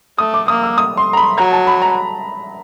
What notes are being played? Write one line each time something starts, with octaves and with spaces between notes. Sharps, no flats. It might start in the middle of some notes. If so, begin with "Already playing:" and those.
A3 D#6
D6
A#3 D#6
E6
D#6
C6
A#5
B5
F#3 A#5
A5
B5
A#5